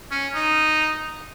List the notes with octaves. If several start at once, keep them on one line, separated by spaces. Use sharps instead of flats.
C#4
D#4